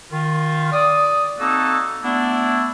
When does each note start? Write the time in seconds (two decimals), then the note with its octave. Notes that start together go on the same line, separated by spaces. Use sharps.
0.13 D#3 F4
0.72 D5 D#6
1.39 A#3 C4 D#4 F#4 A4
2.03 A3 B3 D4 E4